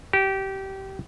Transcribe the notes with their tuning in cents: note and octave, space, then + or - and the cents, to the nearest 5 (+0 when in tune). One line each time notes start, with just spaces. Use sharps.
G4 -20